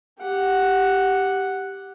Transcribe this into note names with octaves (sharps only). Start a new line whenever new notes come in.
G4 F#5